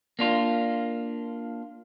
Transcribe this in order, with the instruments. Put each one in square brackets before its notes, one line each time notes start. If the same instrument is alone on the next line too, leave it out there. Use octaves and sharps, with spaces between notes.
[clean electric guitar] A#3 D4 F4